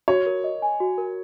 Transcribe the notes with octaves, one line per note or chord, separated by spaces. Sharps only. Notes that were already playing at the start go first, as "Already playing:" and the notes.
F#4 C#5
A#4
D#5
G#5
F#4
A#4